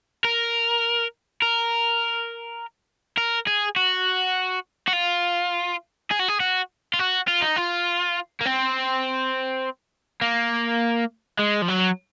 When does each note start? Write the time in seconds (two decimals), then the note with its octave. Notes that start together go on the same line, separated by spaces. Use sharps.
0.25 A#4
1.42 A#4
3.18 A#4
3.47 G#4
3.76 F#4
4.88 F#4
4.93 F4
6.11 G#4
6.19 F#4
6.28 G#4
6.40 F#4
6.94 F4
6.99 F#4
7.28 F4
7.42 D#4
7.56 F4
8.41 A#3
8.45 C4
10.22 A#3
11.39 G#3
11.62 F3
11.68 F#3